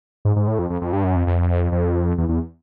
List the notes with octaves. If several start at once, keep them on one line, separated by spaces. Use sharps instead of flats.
G#2
G#2
A2
F2
F2
F2
G2
F#2
F2
F2
F2
E2
E2